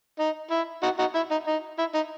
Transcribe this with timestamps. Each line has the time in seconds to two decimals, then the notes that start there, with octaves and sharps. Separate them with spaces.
0.19 D#4
0.51 E4
0.83 D#4 F#4
0.99 D#4 F#4
1.15 E4
1.31 D#4
1.47 D#4
1.78 E4
1.94 D#4